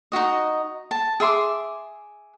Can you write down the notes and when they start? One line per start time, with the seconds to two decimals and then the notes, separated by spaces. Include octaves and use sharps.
0.12 D#4 F4 F#4 D#5
0.91 A5
1.20 G#4 E5 C6 D6